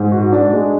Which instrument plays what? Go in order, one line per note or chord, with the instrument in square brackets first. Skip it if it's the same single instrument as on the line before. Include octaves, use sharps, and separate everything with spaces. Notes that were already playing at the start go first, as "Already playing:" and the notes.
Already playing: [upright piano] G#2
F#4
D4
G#3